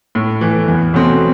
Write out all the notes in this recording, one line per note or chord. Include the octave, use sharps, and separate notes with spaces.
A2
E3 A3
E2
B2 F#3 A3 C4